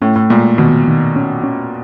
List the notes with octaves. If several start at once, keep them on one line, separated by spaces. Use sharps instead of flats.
A2 C#4
A2
A#2 G#3
B2 D#3
D#3
C#4
C#4